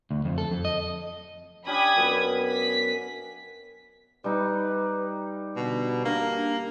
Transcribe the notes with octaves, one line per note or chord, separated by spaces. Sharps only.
D2
F2
A4
F2
D#5
C#4 D4 G4 B5 D#6 G#6
F#2 B3
B6
G3 D#4 B4
B2 D3
A#3 D4